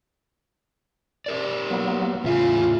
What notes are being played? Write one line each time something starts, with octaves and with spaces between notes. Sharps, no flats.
G4 A#4 D5
F#3 A#3 B3
E2 A2 C#3 F4 E5 G#5